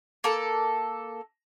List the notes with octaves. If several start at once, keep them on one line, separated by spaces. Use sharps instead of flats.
A#3 A4